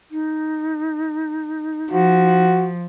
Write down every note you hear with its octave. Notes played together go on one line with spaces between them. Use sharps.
D#4
F3 F#4